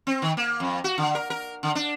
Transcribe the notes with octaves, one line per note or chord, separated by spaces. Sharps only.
C4
D#3
A#3
F2
F#4
D3
A#4
A#4
D3
D4